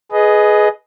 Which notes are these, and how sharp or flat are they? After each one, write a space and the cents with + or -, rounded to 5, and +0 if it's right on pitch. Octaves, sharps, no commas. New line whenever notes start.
G#4 +15 B4 +0 D#5 +0